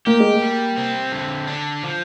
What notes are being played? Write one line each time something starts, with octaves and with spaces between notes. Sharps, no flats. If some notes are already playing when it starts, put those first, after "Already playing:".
A#3 G4
G#3
A#3
G3
C4
D3
D4
F3